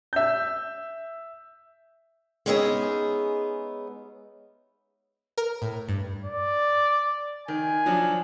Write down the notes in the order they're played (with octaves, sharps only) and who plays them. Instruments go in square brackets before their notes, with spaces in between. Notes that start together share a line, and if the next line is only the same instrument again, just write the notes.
[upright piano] E5 G6
[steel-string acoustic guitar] G#3 B3 C#4 D#4 G#4 E5
[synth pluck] A#4
A2
G2
[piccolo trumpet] D5
[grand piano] D#3 [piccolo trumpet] G#5
[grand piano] F3 F#3 D4